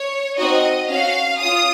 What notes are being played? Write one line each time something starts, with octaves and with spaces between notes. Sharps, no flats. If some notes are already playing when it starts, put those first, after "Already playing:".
Already playing: C#5
C4 D#4 F#4 D#5
C#4 F#4 F5
C#4 F4 D#6